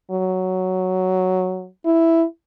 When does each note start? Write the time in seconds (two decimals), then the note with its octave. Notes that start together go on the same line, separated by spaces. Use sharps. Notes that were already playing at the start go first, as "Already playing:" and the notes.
0.11 F#3
1.85 E4